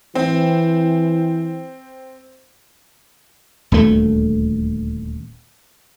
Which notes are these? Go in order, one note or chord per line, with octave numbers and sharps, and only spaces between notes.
E3 C4
D#1 D2 A3